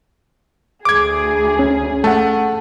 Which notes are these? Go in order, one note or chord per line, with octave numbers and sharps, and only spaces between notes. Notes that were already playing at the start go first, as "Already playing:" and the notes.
D2 G#4 D6 G#6
C#4
A3 F#5 A5